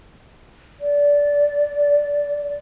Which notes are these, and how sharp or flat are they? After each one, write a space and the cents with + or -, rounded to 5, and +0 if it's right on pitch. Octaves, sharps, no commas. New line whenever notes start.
D5 -15